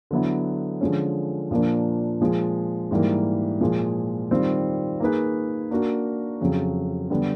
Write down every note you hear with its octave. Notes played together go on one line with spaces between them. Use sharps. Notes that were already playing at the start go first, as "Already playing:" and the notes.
D3 F#3 B3 E4
D3 F3 G#3 C#4
A#2 F3 A#3 D4
A#2 F3 G#3
G#2 E3 G3 A#3
A#2 F3 G#3
D#3 G3 C4 F4
A#3 D#4 G#4 B4
A#3 D4 F#4 A#4
F2 C#3 F#3
D3 G3 B3